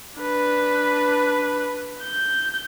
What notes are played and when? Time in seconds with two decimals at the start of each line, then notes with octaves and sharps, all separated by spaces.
0.19 D4 B4
2.03 G6